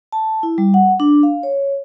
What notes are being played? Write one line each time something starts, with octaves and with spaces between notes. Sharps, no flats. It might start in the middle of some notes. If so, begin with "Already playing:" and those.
A5
E4
G3
F#5
D4
F5
C#5